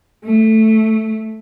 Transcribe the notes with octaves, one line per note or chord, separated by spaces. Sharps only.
A3